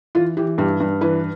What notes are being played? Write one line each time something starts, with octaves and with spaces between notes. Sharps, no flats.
E3 F4
E3 G4
G2 G4
G2
E3 B4